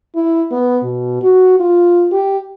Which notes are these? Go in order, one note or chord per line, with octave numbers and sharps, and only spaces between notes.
E4
B3
B2
F#4
F4
G4